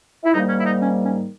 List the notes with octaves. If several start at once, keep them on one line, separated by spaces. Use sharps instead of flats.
E4
G#2 D#3 G3 A#3 D#4
C#4
E4
D#4
C#4
C#4